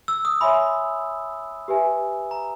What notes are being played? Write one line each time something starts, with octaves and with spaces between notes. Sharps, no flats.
E6
D#6
C#5 E5 G#5 B5 C6
G4 B4 E5 G#5
A#5